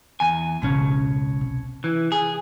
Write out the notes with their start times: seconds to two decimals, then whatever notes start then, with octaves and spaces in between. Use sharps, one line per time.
0.20 E2 G#5
0.62 G#1 C#2 B2 C#4
1.41 C3
1.84 E3
2.12 G#4